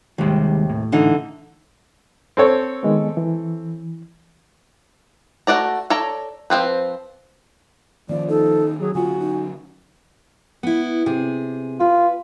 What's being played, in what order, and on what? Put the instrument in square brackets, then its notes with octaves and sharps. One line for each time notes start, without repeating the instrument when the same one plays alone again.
[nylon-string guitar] D#2 C3 [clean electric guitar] D#3 G3 G#3
[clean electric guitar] A2
[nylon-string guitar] D3 E3 D#4
[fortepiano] C4 A4 C#5
[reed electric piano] D#3 G#3 B3
E3
[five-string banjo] A3 F#4 D5 A#5
A4 C#5 D5 A#5
F3 G#3 C4 B4
[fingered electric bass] D#3 A#3 C#4 [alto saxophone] F3 [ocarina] D5
[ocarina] D#4 [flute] A4
[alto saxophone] F#3 [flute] G#4
[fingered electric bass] D3 F#3 C#4 [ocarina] F4 [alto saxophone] F#4 [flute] G#5
[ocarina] D#4
[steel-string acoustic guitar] B3 E4
C3 G#4
[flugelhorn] F4 [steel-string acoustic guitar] B4